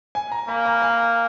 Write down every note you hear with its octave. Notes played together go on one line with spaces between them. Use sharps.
G#5
A#5
A#3 B5
A#5
G#5